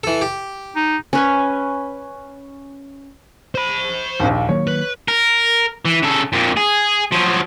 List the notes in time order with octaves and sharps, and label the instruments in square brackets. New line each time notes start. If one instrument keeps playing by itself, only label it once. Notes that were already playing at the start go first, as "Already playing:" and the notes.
[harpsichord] E3 A4
G4
[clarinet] D#4
[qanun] C#4 B4 G#5
[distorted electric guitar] C5 B5
[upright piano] A#1 D#2
[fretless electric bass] D#3 F#3 A#3 [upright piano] C#5
[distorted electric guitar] B4
[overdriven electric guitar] A#4
E3
C#3 A4
F2 A#2
G#4
F3 F#3